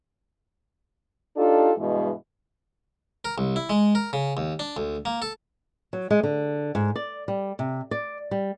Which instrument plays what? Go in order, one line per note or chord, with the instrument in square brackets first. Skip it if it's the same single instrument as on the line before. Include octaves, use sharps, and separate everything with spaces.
[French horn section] D4 D#4 F4 G4 A4
G2 B2 E3 G#3
[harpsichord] A#4
C2
E4
G#3
A#4
C#3
D#2
D4
D2
A#3
A4
[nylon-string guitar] F#3
G#3
D3
G#2
D5
G3
C3
D5
G3